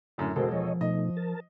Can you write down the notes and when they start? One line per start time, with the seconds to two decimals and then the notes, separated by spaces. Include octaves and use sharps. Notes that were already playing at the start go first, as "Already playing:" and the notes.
0.18 F#2 A2 D3
0.36 E1 G#3 F#4 A4 A#4 C5
0.52 F3 C#5 D#5
0.81 B2 A3 D#4 D#5
1.17 A#4 A5